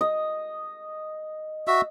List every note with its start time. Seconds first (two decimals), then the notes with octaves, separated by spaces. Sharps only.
0.01 D#5
1.68 F#4 E5 E6